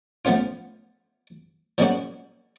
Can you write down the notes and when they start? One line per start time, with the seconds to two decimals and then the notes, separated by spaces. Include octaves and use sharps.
0.25 F3 A3 B3 C#4 F4
1.78 F3 G3 G#3 A#3 C#4 F#4